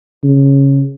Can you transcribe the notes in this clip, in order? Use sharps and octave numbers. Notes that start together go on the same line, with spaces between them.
C#3